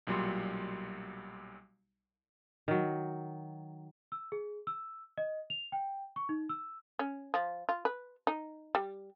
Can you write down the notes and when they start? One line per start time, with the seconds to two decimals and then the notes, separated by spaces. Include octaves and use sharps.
0.07 B1 A#2 F#3 G3 C6
2.68 D#3 F#3
4.12 E6
4.32 G#4
4.67 E6
5.18 D#5
5.50 F7
5.72 G5
6.16 C#6
6.29 D#4
6.49 E6
6.99 C#4
7.34 F3
7.69 F4
7.85 B4
8.27 D#4
8.75 G3